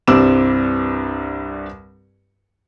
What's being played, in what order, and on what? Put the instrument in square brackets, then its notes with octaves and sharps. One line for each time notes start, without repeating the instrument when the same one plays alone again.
[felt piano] C2 G2 C4 D6 E6 E7